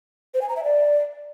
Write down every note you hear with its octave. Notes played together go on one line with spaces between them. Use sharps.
C5
G#5
A#5
E5
D5